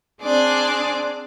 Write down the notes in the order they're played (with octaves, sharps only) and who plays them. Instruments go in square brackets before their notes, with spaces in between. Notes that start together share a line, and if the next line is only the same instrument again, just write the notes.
[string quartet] C4 D4 G#4 D5